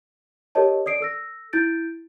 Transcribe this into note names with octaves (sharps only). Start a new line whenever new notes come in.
G4 A4 A#4 C#5 D#5 A5
D5 D#6 C7 D7
A4 E6 A#6
E4 G6 A6 D7